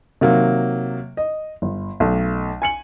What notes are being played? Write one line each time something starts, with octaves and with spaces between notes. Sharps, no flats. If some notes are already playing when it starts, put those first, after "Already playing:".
C3 D#3 F#3 A#3
D#5
G1
B1 A3
G#5 C#7 F#7